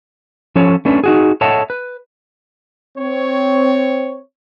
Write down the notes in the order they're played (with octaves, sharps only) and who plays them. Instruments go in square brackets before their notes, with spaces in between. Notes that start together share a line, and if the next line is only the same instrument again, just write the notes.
[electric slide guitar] F3 C#4 A4 C#5
A3 C#4 D4 B4
D#4 F#4 G#4
A4 C#5 D#5 E5 F#5 A5
B4
[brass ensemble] C4 C#5